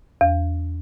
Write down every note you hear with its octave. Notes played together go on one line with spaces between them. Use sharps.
E2